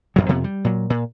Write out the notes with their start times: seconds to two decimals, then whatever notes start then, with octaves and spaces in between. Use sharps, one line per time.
0.16 A1 F#2 F#3
0.29 F2 C3 B3
0.44 G3
0.64 A#2 F#3
0.90 A#2